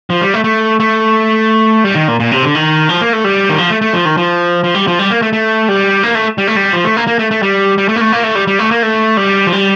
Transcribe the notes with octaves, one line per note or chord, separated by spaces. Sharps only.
F3
G3
A3
A3
A3
G3
D#3
A#2
A#2
C3
D3
D#3
F3
A#3
A3
G3
D#3
F3
A3
A3
F3
D#3
F3
F3
G3
F3
G3
A#3
A3
A3
G3
A#3
A3
G3
A3
G3
F3
A3
A#3
A#3
A3
A3
G3
G3
A3
A#3
A3
A#3
A3
G3
G3
A3
A#3
A3
G3
F3
G3